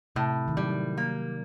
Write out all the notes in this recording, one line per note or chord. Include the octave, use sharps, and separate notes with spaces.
A2 C3
D#3
F#3 G3
A#3